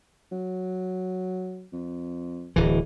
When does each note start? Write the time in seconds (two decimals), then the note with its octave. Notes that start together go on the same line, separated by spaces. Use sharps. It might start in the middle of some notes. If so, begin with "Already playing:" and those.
0.32 F#3
1.73 F2
2.56 D1 E3